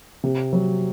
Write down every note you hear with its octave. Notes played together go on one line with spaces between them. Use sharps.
C3
F#3